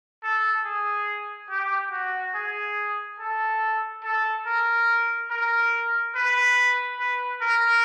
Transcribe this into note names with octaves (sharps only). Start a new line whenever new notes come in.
A4
G#4
G4
F#4
G#4
A4
A4
A#4
A#4
B4
B4
A#4